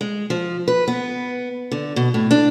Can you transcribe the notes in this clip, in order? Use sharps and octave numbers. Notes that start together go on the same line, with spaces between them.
G#3
F3
B4
B3
D3
B2
A2
D4